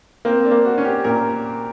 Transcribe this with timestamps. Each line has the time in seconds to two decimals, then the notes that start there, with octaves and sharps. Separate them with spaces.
0.25 A#3 C4
0.45 D4
0.51 A#3
0.65 F#4
0.78 C#4
0.85 G4
1.04 A#2 A#4